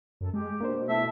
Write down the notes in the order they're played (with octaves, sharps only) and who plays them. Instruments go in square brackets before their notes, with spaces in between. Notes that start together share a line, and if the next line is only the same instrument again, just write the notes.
[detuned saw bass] F#2 [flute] A4
[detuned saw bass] G#3 [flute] G4
[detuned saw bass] B2 [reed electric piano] A#3 D4 C5
[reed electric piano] A3 E4 [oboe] E5 [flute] A5